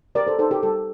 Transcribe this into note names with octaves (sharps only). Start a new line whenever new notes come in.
G4 A#4 D5
A4 C5
D#4 A4 C5
G4 A#4
G3 A4